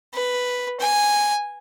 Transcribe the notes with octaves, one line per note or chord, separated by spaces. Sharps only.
B4
G#5